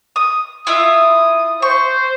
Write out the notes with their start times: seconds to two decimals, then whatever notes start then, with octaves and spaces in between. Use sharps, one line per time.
0.16 D#6
0.67 E4 F4 E5 D#6
1.62 C5 C#6